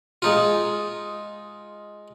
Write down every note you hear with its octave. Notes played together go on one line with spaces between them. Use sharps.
G#3 D#4 F4